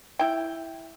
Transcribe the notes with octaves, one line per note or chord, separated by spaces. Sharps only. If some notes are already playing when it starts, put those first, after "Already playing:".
E4 G5